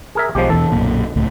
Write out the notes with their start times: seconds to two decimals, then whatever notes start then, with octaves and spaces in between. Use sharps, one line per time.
0.15 G#4 A#4 E5
0.35 B1 F3 G#3 G4
0.50 E2 B2 E3 A4
0.72 B1 F#2 A#2
1.16 C#2 A2